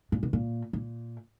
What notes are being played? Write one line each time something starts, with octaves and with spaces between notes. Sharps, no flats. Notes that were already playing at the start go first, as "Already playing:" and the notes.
A#2
B2
A#2
A#2